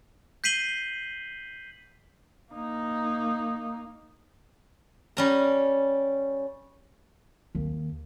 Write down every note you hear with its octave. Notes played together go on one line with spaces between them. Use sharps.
G6 B6 C7 D#7 F#7 G7
A#3 D#4
G3 C#4 A#5
D#2